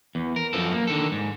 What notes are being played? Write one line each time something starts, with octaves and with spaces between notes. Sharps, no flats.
E2
A#4
F#2 F3 A4
A#3
D3 D#3 A4
G#2